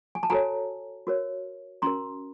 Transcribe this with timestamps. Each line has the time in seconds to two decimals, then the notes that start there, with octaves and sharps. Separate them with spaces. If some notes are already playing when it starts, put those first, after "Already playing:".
0.15 G#5
0.23 A5
0.30 F#4 A4 C#5 G#5 A#5
1.07 F#4 A#4 C#5
1.82 C#4 F#4 A#4 A#5 C6